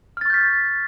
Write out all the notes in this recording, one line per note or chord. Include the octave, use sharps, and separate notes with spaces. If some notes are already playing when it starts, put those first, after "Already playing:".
C#6 F6 G6 A6 B6